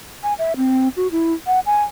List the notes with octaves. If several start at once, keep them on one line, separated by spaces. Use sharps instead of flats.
G#5
E5
C4
F#4
E4
F#5
G#5